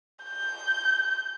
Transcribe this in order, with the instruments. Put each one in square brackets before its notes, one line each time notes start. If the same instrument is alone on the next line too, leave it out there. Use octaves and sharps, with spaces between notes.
[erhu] G6